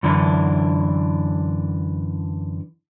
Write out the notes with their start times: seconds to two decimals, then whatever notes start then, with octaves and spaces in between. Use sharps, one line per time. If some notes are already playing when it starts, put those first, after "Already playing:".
0.03 F#2 D3 E3 D4